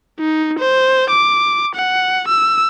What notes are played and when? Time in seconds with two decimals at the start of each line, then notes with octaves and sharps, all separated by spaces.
0.20 D#4
0.59 C5
1.10 D6
1.75 F#5
2.28 E6